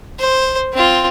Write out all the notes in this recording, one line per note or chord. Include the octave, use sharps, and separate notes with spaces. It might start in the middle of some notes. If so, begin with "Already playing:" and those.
C5
C4 F4